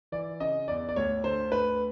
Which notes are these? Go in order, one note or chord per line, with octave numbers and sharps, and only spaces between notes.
E3 D5
C#3 D#5
E2 D5
D5
D2 C#5
D3 C5
D2 B4